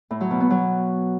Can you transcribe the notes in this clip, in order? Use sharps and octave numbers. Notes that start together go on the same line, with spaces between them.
A2
F#3
B2
B3
F#3